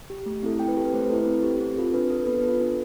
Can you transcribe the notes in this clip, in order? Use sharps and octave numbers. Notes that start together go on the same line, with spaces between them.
G4
A3
C4 E4 A4
C4 G5
B4
G4 A4
B4
A3 C5
B4
C4 E4 A4
B4
C4
G4
C4
F4 A4
D4 B4
A4
B3 B4
A4
F4
D4